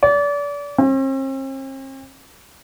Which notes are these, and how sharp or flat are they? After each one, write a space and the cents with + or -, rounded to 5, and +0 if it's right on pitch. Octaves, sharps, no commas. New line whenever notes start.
D5 -35
C4 +45